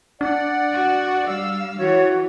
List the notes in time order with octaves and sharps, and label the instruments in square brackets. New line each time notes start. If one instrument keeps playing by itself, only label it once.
[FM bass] D4 [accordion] D5 F#5
[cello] F#4
[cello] G3 F5 [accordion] E6
[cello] E3 [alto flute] F#4 [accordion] C#5